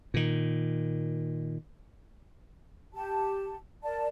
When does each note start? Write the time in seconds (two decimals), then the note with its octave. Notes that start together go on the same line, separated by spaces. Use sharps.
0.14 A#2 D#3
2.95 G4 A5
3.83 A#4 D5 A5